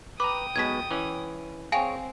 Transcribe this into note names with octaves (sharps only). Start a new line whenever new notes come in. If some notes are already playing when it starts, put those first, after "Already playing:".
B4 G5 A#5 D6 D#6
B1 B2 G#3 G#6 B6
E3 C#4
C4 G#4 C#5 F5 G5 G#5